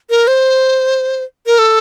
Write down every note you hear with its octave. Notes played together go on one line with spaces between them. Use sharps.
A#4
C5
A#4
A4